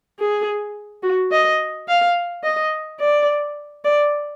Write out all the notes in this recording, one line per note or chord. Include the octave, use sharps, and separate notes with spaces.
G#4
F#4
D#5
F5
D#5
D5
D5